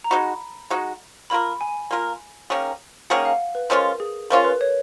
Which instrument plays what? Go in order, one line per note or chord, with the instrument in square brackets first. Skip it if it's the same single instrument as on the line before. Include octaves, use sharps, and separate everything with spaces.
[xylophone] A#5
[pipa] G#3 D#4 F#4 [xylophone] B5
[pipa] G#3 D#4 F#4
[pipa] A#3 F4 A#4 [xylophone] B5
[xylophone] G#5
[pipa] A#3 F4 A#4
D#3 A#3 C#4 G#4
[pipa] D#3 A#3 C#4 G#4 [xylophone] F#5
[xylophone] F5
B4
[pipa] F3 G#3 C#4 F4 [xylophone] A#4
[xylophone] G#4
[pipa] F3 G#3 C#4 F4 [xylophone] A#4
[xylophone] B4
C#5